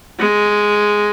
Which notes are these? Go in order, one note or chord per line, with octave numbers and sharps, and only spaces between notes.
G#3